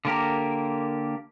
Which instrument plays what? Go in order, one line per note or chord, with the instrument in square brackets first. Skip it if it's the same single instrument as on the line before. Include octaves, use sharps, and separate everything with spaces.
[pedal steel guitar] D3 A#3 G4 A#4